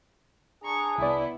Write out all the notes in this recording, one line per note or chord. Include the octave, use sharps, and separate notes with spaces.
D4 G#4 A#5 C#6
C2 B3 E4 D5